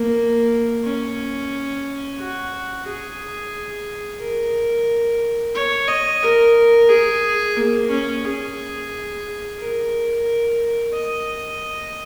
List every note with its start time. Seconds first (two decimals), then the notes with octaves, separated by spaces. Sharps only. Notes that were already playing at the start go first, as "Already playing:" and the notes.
Already playing: A#3
0.84 C#4
2.19 F#4
2.86 G#4
4.20 A#4
5.55 C#5
5.88 D#5
6.22 A#4
6.89 G#4
7.57 A#3
7.90 C#4
8.24 G#4
9.59 A#4
10.93 D#5